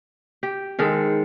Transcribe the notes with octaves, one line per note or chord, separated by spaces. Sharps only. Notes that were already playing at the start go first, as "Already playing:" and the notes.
G4
G#2 D#3 G#3 A4